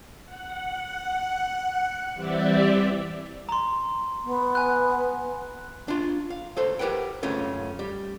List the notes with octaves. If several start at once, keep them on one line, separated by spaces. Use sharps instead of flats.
F#5
E3 G3 C4 G4 D5 E5
A#5 C6
B3
G#5 F#6
D4 F4
F5
C#2 A4 C5
G4 A#4 B4 F#5 G5
F#2 C#3 A3 C#4 F4
G3